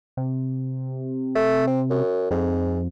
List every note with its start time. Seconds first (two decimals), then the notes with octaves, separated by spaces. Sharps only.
0.17 C3
1.35 A3
1.67 C4
1.90 F#2
2.31 F2 G#2